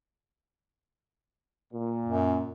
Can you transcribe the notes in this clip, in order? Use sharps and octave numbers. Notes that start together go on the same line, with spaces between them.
A#2
F#2